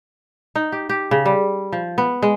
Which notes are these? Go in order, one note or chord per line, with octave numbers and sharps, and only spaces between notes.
D#4
G4
G4
C#3
G3
F3
B3
G#3